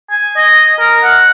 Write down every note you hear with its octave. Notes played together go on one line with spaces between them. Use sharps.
G#5
D#5
A#4
F#5